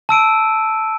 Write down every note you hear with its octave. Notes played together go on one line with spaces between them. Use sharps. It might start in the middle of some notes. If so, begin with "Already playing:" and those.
A5 E6 D7 D#7